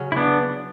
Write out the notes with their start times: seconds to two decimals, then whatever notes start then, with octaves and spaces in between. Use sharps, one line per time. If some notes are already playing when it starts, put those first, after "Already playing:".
Already playing: C#3 F#3 C#4
0.12 E4
0.16 B3 D4